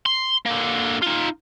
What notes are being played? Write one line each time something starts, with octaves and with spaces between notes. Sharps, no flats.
C6
D3 A#3
D#4 F4